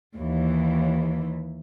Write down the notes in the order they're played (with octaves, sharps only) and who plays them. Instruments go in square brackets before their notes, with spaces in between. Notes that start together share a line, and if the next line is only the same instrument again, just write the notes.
[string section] D#2 E3